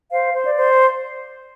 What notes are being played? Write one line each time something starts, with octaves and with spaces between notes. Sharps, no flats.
C5 F5
C5
D5
C5